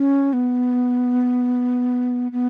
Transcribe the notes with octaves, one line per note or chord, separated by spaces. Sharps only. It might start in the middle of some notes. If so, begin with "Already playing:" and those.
Already playing: C#4
B3
B3